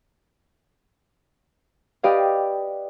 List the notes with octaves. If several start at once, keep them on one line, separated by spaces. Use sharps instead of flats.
G4 B4 D5 D#5 F5